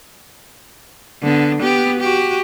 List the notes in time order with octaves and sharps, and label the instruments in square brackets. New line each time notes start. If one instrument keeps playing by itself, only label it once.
[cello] D3 B3
B3 G4
F#4 G4